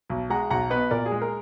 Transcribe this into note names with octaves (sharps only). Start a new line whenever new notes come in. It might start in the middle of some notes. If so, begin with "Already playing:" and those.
B1
G#3 F#5 A#5
B1 F#5 A#5
B3 B4 D#5
A#2 A#4 D5
G#4
G#3
A#4